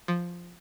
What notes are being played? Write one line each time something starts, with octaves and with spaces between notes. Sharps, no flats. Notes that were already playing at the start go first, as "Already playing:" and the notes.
F3